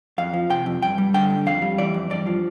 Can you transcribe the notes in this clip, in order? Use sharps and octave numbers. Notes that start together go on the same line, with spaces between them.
F2 F5
F3
C3 G5
F2
G2 G5
G3
D3 G5
G2
F2 F5
G3
E3 D5
F2
G2 D5
F3